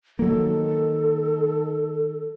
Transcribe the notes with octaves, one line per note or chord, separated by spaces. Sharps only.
D#3 F#3 A#3 A4